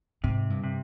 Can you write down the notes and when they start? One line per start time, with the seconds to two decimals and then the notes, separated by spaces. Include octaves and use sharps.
0.24 G#2 C3
0.50 G2
0.64 C3